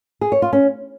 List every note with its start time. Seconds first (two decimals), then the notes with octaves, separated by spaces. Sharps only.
0.21 G#4
0.32 C#5
0.42 F4
0.53 C#4